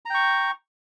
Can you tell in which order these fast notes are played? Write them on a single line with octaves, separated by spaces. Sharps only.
A#5 G5 C#6